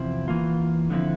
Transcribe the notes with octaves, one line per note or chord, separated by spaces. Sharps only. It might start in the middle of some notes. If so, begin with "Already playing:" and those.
Already playing: E2 C3 F3 C4 E4
E2 E3 A#3 F4
D3 F3 A3 C4 E4